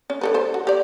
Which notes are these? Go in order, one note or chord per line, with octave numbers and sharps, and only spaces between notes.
C#4
D3 A4 B4
A4 C5
F#4
G4 D5